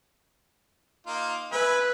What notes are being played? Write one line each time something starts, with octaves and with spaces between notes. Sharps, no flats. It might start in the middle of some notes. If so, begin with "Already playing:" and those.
A#3 D#4 F4
B4 E5 G#5 B5